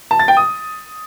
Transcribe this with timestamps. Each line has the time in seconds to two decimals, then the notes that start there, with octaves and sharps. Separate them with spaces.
0.11 A5
0.19 A6
0.28 G5
0.37 D#6